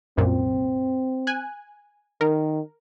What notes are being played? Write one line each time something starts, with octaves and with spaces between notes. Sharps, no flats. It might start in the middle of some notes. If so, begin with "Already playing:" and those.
C2 F#2 A#2 C4
G#5 F#6
D#3 A#4